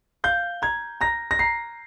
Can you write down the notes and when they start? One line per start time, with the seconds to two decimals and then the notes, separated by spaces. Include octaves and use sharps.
0.24 F5 G6
0.62 A#5 G#6
1.00 A#5 A#6
1.31 A#6
1.39 A#5 C7